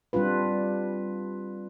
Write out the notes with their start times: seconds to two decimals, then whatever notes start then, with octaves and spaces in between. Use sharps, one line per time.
0.13 G3 C4 D4 F4 B4